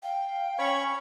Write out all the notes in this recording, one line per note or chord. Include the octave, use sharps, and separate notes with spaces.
F5 G5
C#4 C#5 B5 C#6